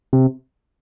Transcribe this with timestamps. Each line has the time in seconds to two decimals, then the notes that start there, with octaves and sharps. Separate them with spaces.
0.13 C3